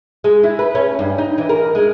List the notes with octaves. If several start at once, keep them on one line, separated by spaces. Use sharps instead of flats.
G#3
E4
B4
C#4
G2
D#4
E3
A#4
G#3